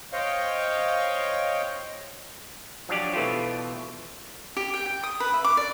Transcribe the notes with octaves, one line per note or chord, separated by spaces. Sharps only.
C5 C#5 D#5 F5 G5 C#6
F3 F#3 D4 G4 D5
B2 E3 A3 F4 G4
G4
G5
G5
D#6
B4
E5
D6
D5